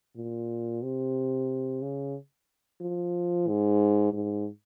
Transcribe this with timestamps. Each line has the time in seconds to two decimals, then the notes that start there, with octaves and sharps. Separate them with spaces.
0.16 A#2
0.82 C3
1.82 C#3
2.81 F3
3.48 G#2
4.13 G#2